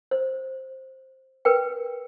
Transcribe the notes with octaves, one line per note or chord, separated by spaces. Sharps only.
C5
A#4 B4 G5